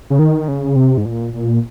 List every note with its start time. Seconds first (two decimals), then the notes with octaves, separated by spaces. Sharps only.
0.10 C#3
0.19 D#3
0.48 C#3
0.76 C3
0.98 G#2
1.05 A#2
1.33 A#2